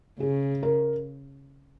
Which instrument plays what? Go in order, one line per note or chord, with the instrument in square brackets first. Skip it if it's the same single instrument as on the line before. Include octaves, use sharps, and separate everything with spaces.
[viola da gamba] C#3 [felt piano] G#4
[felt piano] A#4